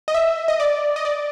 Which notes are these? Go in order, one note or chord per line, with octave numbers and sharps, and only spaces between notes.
D#5
E5
D#5
D5
D#5
D5